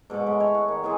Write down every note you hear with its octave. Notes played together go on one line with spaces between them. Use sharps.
G#2 B2 C#5 D6
G#3 A3 B5
C#5
F#5
D#3
E3 B3 C4 G#4